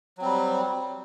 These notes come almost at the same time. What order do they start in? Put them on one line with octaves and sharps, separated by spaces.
F#3 C4 G3